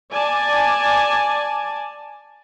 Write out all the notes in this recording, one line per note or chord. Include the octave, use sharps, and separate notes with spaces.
D5 G#5 A5